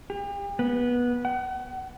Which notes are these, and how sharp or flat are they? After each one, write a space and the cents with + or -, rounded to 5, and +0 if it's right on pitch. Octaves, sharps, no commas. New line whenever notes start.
G4 +40
B3 -20
F#5 +35